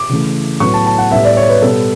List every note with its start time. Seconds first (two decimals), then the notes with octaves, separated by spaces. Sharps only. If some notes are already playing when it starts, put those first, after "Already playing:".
Already playing: D6
0.09 C#3 E3 A3
0.60 A2 F#3 B3 C#6
0.74 A5
0.86 A5
0.98 F#5
1.11 A2 G3 B3 E5
1.25 D5
1.37 C#5
1.49 B4
1.62 B2 G3 B3 A4